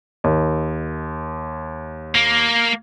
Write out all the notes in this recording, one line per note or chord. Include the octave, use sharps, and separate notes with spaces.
D#2
A#3